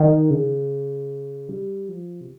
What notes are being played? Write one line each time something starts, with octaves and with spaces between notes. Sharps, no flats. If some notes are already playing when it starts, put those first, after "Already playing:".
Already playing: D#3
C#3
G3
F3
C3